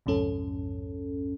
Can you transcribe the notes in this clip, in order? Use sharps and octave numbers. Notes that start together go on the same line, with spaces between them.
B1 F2 G#2 C#4 A4